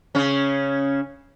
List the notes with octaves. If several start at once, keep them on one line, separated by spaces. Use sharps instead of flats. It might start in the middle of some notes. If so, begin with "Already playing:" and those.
C#3 C#4